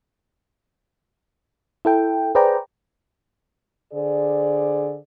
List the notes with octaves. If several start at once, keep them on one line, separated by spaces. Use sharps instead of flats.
E4 A4 G5
G#4 B4 C5 D5 G5 A#5
D3 G#4 C5 D5